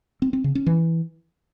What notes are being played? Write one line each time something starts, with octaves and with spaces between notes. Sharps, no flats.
C4
C4
C#3
C#4
E3